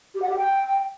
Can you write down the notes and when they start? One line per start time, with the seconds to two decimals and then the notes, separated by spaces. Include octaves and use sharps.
0.15 G4
0.22 F#5
0.29 G4
0.37 G5